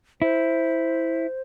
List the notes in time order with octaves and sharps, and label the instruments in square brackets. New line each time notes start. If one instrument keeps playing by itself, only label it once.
[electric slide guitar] E4 [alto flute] C5